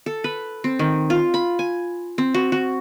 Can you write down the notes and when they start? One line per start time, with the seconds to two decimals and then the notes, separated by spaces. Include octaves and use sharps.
0.06 A4
0.24 B4
0.64 C4
0.79 D#3
1.10 F4
1.34 B5
1.59 G#5
2.18 C4
2.34 F#4
2.52 F#4